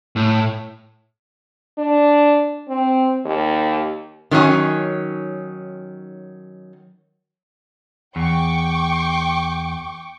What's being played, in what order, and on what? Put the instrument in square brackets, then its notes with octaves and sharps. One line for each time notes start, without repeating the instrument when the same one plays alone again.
[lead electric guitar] A2
[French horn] D4
C4
D#2
[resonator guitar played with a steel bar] D#3 F#3 C#4 D#4 G#5
[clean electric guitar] E2 [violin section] G5 C#6 D6